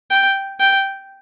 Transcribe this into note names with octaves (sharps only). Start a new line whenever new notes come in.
G5
G5